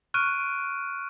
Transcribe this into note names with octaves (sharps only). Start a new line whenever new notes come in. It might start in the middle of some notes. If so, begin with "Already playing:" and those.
C#6 F6 F#6 D7 D#7